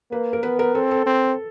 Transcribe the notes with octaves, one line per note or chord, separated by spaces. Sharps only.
A#3 B4
A#4
B3 B4
A#4
C4 A4
A4
C4